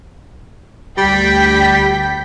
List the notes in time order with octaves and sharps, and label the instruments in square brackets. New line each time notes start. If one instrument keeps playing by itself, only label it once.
[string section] D2 G5 B6 [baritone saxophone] G3